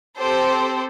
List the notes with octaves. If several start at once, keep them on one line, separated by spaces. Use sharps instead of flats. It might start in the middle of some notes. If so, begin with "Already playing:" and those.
C4 G4 A4 C5